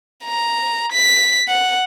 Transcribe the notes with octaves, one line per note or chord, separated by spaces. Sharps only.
A#5
B6
F#5